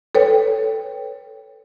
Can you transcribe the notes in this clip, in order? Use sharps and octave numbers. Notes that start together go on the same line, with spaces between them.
A4 B4 C#5 G5